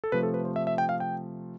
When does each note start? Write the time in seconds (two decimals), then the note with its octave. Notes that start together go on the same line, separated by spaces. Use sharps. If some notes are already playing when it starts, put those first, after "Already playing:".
0.04 A4
0.12 C3 F3 A3 B4
0.23 A4
0.34 B4
0.45 C5
0.56 E5
0.67 E5
0.78 G5
0.89 F5
1.00 G5